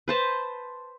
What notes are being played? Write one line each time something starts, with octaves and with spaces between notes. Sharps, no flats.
B4 C5 A5